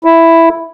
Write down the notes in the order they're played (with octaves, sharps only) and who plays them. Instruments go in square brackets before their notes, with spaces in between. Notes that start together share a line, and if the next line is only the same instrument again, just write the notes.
[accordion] E4